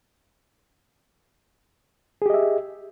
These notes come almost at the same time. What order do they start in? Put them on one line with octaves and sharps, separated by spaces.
G#4 G4 D#5 E5